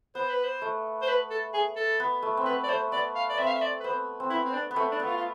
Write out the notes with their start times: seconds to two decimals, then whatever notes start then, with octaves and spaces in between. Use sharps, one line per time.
0.15 B3 C5
0.29 B4
0.43 C5
0.62 A3
1.02 C5
1.08 B4
1.30 A4
1.54 G#4
1.76 A4
2.00 B3
2.22 A3
2.37 C4
2.45 B3 B4
2.64 D5
2.69 A3 C5
2.92 B3 D5
3.15 F5
3.29 D5
3.38 C4 E5
3.47 F5
3.55 E5
3.62 D5
3.80 B4
3.84 B3 C5
4.20 C4
4.30 B3 E4
4.45 C4
4.53 D4
4.71 B3
4.76 A3 C4
4.91 D4
4.99 B3
5.07 F4
5.17 F4